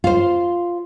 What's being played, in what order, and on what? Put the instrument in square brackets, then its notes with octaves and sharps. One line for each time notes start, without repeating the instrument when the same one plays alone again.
[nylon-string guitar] F4 C5